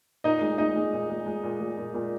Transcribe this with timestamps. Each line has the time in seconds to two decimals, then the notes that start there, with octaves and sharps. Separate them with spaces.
0.24 A#2 D#4 D#5
0.41 G#3
0.58 G#3 D#4 D#5
0.76 G#3
0.93 A#2
1.09 G#3
1.26 G#3
1.44 A#2
1.60 G#3
1.77 A#2
1.94 A#2